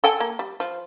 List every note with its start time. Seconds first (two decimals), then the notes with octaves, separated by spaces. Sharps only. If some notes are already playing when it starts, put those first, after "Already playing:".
0.04 A4 G5 G#5
0.20 A#3
0.39 G3
0.60 F3